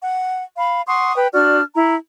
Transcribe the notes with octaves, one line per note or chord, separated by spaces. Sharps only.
F#5
F5 B5
F#5 C6 C#6 D#6
B4 G5
D4 F#4 D5 F6
E4 A#5